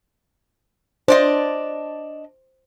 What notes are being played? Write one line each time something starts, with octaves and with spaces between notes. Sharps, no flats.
D4 C5 D5 D#5